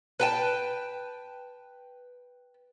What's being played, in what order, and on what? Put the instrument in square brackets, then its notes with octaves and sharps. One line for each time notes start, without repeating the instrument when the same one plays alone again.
[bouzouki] B4 G5 A5